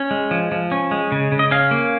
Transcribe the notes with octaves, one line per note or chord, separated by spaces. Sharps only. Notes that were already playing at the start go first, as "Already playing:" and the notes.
Already playing: C#4
G#3
F3
F3
C#4
G#3
C#3
C#3
D#5
C#4 F5
A#3